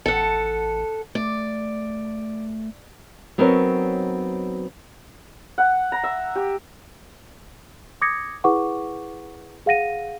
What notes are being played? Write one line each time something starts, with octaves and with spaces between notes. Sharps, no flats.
A1 A4 F#5
A3 D5
F#3 B3 C4 D#4 A#4 C#5
F#5
A#5
E5
G4
D6 D#6 G#6 A#6 C#7
E4 G#4 B4 F#5 C#6 D6
G#4 F5 F#5 A#6 D#7